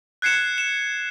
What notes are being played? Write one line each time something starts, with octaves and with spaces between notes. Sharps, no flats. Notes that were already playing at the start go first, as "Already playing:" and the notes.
F#6 G#6 C7 C#7 E7
E7